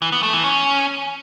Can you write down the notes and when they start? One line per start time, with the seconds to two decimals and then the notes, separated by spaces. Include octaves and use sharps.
0.02 E3
0.12 B3
0.23 A3
0.33 E3
0.44 C#4